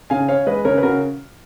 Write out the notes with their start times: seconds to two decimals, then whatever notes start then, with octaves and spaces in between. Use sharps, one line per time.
0.10 C#3 F5 G#5
0.28 C#4 C#5 F5
0.47 G#3 B4 D#5
0.65 C#3 A#4 C#5
0.78 B4
0.83 C#3 F#4 A#4